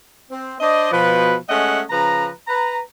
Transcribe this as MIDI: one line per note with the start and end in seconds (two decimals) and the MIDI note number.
0.31 0.56 60
0.61 0.88 62
0.61 0.88 72
0.61 0.88 74
0.61 0.88 75
0.92 1.35 47
0.92 1.35 53
0.92 1.35 71
1.49 1.82 56
1.49 1.82 57
1.49 1.82 61
1.49 1.82 75
1.49 1.82 76
1.49 1.82 78
1.90 2.29 49
1.90 2.29 53
1.90 2.29 71
1.90 2.29 82
2.48 2.79 71
2.48 2.79 82